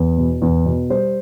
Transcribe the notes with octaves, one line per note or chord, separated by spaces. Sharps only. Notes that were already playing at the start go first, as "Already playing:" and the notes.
Already playing: E2
B2
E2
B2
G3 C5